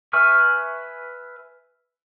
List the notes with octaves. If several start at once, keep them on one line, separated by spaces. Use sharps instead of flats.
B4 E5 G#5 C#6 F6